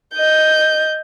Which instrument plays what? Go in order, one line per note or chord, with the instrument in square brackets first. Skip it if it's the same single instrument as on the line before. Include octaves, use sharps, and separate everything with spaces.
[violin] D#5 G6